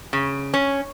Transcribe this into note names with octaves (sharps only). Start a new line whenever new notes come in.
C#3
C#4